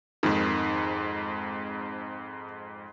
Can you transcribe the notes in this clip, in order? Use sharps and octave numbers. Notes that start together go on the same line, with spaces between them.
F2 G#2 D#3